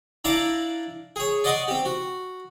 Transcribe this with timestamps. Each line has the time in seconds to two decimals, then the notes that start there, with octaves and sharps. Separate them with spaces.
0.25 D4 E4 F5 A5 A#5 D6
1.16 G#4 C#5
1.44 D5 D#5 F#5 C6 C#6 D#6
1.68 C4 G4
1.85 F#4